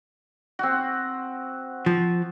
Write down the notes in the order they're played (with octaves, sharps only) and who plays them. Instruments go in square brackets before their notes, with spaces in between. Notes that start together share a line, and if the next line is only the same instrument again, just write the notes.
[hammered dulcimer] C4 F#4
[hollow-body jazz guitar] F3